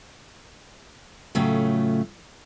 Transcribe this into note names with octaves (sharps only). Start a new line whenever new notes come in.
A2 C#3 F#3 A3 F4